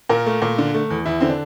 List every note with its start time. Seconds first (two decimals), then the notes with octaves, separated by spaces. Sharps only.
0.09 A#2 A#4
0.26 A3
0.42 A#2
0.58 D3
0.74 A3
0.90 E2
1.06 E2 E4
1.20 D3 C4
1.30 D4